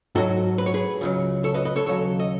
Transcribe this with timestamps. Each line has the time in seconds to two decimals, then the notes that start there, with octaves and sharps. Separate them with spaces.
0.15 G#2 F#3 F#4 A4
0.58 B4
0.66 C#5
0.74 G#4 B4
1.01 C#2 C#3 F#3
1.44 A4 C#5
1.54 B4 D#5
1.65 B4 D#5
1.76 A4 C#5
1.86 D#2 C#3 F#3 A4 C#5
2.20 D#5